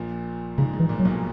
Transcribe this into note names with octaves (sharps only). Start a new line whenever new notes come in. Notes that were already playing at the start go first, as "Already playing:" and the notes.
Already playing: A#1 A#2
G#2 C#3
G#2
E3
A#1 A#2
F#3
B1 B2